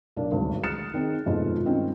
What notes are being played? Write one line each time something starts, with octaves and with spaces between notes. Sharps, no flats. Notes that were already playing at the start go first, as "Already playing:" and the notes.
B1 A#3 D4
D#1 G#1 D2
D#6 F6 F#6 A6 C#7 E7
D#3 C4 D#4 G#4
F2 G#2 B2 G#3 A3 F4
G2 D#3 C4 C#4